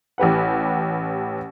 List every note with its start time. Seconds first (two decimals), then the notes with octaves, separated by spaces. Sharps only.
0.18 A1 G4 B4 F#5